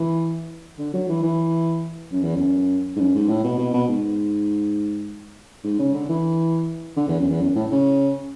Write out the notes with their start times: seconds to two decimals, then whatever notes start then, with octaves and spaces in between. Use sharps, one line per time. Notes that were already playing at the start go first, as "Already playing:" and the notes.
Already playing: E3
0.79 D3
0.93 F#3
1.09 E3
1.23 E3
2.12 F#2
2.23 E2
2.36 F#2
2.96 G#2
3.00 F#2
3.15 G#2
3.29 A2
3.44 B2
3.58 B2
3.74 B2
3.88 G#2
5.64 G#2
5.79 C#3
5.94 D3
6.09 E3
6.96 D3
7.08 E2
7.19 F#2
7.30 E2
7.41 F#2
7.55 A2
7.71 C#3